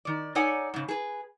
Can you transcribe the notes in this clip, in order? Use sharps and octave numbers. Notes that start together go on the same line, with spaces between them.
D#3 D5
D#4 A4 C#5 D5 F#5 G#5
G#2 C#3
G#4 B4